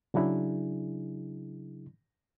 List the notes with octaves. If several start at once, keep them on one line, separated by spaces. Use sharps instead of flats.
C#3 F#3 D4 E4 G#4